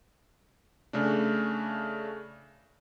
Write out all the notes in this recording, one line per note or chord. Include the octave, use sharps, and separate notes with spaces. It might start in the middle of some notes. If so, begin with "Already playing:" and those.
C#3 A3 D4